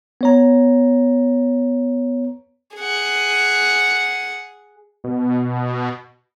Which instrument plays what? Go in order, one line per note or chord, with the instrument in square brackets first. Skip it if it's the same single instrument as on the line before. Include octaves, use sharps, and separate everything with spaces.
[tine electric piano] B3 C#5 A#5
[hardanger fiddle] G#4 F#5
[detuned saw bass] B2